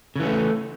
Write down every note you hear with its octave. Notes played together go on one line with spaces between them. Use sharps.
C#3 E3 A3 C#4